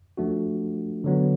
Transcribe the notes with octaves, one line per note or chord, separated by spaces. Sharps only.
F3 A3 D4 F#4
D3 F#3 B3